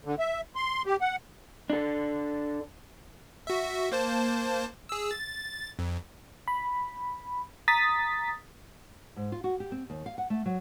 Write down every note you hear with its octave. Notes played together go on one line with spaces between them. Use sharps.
D3
E5
C6
G4
F#5
D4 A4
F#4 E5
A#3 C5 A5
G#4 E6
A6
F2
B5
A#5 D#6 A6 B6
G#2
F4
F#4
G4
C4
D#2
F5
F#5
A3
F#3